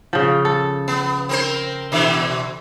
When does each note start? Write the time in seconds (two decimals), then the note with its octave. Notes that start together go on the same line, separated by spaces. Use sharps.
0.13 C#3 F3
0.45 A4
0.88 B3
1.29 C4 A#4 C5
1.92 B2 D3 E3